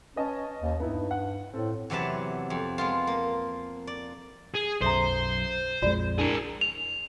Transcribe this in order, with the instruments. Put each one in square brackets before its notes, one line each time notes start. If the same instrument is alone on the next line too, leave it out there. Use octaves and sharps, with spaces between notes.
[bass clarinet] C#4 [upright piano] B4 D#5 A5
[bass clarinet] D#2
[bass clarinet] G2 [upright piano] B3 D#4 E4
[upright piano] F#5
[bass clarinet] A2 [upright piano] C4 A4
[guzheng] E2 C3 F#3 B4 A5
F2
G#3 B3 F4
A#3
D5
[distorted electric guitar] G#4
[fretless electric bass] B1 F#2 [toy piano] A4 E5 A#5 [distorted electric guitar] C5
[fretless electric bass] A#1 F2 G#3 [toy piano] F4 F#4 D5
[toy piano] D4 E4 G#5 [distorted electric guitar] G#4 A#4
[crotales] F7